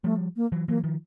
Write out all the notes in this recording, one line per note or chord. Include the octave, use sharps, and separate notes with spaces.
F3 G3 A3
A#3
E3 F#3
E3 F#3 A#3
D#3 F3